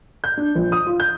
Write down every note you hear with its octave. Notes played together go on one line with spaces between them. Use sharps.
G6
D4
A#1
D#6
F4
G6